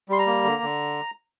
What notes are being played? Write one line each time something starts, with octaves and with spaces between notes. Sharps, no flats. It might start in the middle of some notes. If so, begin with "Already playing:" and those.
G3 C6
A#5
A#3
D3
D3